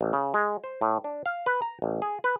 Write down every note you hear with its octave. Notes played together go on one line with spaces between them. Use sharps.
A1
C#3
G#3
C5
A2
D4
F5
B4
A#5
A1
G#4
B4